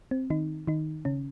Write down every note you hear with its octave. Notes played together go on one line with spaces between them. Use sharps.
C4
D#3 D#4
D#3 D#4
C#3 C#4